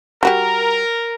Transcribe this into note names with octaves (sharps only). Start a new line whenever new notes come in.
G3 F#4 G4 A#4